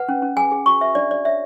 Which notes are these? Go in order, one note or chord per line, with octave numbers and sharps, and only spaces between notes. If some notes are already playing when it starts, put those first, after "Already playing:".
Already playing: B4 F#5
C#4
C#4
G#4 G#5
G#4
F#4 C#6
B4 E5
D4 D5
D4 D5
C#5 E5